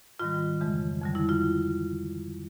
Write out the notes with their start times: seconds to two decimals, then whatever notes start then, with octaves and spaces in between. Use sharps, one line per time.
0.19 G#2 D#3 G3 F4
0.61 F2 C#3 E3 G#3
1.01 F2 D3 G3
1.15 E4
1.29 F4